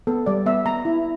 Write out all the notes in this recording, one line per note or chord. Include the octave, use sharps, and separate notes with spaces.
B3 A4
G3 D5
B3 E5
B3 A#5
E4